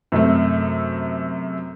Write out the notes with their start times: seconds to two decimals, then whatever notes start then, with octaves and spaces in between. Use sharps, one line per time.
0.12 F#2 C3 A3